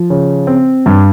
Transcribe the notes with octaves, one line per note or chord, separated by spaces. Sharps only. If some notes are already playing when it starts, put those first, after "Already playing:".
Already playing: F3
C#3
C4
G2